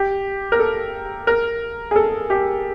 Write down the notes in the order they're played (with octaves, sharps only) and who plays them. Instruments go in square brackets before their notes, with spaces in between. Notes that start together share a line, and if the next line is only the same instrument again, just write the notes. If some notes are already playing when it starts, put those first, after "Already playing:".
Already playing: [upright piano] G4
A#4
A4
A#4
G#4
A4
G4